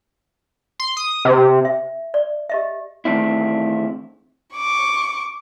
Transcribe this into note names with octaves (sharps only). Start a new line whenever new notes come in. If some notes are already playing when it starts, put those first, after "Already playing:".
C6
D#6
C3
E5
D5
G4 D#5 E5
E2 D#3 A3 C4 D4 E4
C#6 D6